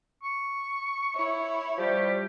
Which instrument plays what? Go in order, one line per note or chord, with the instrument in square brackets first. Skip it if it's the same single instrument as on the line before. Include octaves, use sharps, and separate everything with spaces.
[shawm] C#6
[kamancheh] E4 C#5
[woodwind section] F3 G3 G4